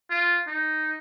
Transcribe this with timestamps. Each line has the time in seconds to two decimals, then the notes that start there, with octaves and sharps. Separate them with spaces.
0.10 F4
0.48 D#4